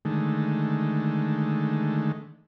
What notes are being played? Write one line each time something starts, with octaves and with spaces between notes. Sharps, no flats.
D3 D#3 G#3 A3